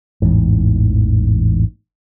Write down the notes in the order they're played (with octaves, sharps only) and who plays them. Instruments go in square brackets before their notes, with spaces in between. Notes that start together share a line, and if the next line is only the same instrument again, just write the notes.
[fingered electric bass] A1 E2 G#2